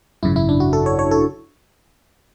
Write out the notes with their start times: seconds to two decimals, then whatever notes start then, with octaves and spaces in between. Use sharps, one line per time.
0.23 G#1 F#2 C#3 E4
0.36 E4
0.49 D4
0.60 F#4
0.73 A4
0.86 C#5
0.99 C#5
1.11 A4